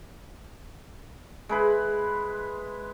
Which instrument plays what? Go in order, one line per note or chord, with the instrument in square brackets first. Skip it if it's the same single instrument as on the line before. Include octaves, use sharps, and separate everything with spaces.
[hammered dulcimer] G#3 E4 B4